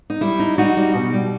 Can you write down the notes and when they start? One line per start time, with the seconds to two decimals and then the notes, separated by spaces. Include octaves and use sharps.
0.10 D#4
0.21 G3 E4
0.39 D#4
0.58 G3 D#4 F#4
0.77 G3
0.94 B2
1.13 G3